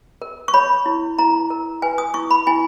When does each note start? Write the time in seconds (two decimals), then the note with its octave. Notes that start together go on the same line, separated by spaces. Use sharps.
0.22 A#4
0.48 C#6
0.54 C#5 B5
0.86 E4
1.18 E4 A#5
1.50 A#4
1.82 B4 G#5
1.98 D#6
2.14 E4 C#6
2.31 B5
2.47 E4 G#5